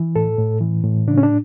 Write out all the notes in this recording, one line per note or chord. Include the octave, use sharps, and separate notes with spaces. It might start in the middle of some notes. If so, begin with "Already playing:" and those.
Already playing: E3
A2 A4
A2
E3
A2
C#3 D4
C#4
D4